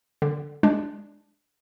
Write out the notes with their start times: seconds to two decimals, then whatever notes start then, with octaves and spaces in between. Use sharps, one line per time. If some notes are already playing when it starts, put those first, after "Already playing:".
0.22 D3
0.63 G#3 D4